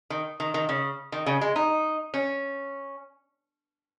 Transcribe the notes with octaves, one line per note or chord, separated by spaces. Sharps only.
D#3
D#3
D#3
C#3
D#3
C#3
G#3
D#4
C#4